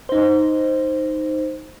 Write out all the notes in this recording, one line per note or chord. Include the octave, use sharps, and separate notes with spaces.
D#4 C5